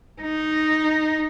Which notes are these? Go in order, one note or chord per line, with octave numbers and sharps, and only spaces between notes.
D#4